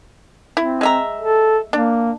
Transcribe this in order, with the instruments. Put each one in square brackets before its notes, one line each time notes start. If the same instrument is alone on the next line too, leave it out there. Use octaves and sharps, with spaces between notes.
[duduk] C4 [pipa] E4
[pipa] G#3 E5 A#5
[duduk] A4
[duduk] A#3 [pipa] D4